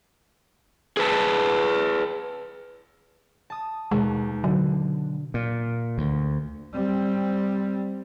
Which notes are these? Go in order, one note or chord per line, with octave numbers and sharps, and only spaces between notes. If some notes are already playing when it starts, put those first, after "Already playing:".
G#4 B4 A5
A5 D#6
D#2 B2 G#3
D3 F#3
A#2
D2
G3 C4